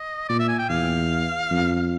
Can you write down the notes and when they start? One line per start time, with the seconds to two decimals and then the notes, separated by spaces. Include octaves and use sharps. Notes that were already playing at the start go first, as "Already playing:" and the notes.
Already playing: D#5
0.29 A#2 D5
0.39 E5
0.48 G#5
0.59 G5
0.69 E2 F5
1.51 F2